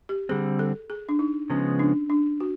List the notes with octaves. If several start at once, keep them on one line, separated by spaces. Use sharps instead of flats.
G4
D3 G3 C4 G#4
A4
G#4
D4
D#4
C#3 F3 G#3 B3 C#4
D4
D4
F#4